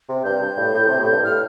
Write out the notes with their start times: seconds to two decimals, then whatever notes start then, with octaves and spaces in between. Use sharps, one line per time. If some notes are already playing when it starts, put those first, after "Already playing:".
0.09 C3
0.24 G2 G6
0.41 G2
0.58 A2
0.74 A2
0.87 C3
1.00 A2
1.12 G2
1.24 A2 F6